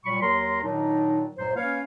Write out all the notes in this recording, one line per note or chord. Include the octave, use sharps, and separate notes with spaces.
A#2 F#3 G3 B5 C#6
D#2 F#3 A#4 A#5 C6
A#2 D#3 F#3 D4 D#4
C#2 G2 A#2 F#3 C5
A#3 C#4 B4 C#5 F5